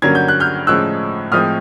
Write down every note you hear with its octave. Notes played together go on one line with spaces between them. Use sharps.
G2 D3 F#3 A#3 C#4 G#6
G6
F#6
F6 G6
A2 F3 G#3 C#4 E6 F#6
A2 F3 G#3 C4 D#6 F6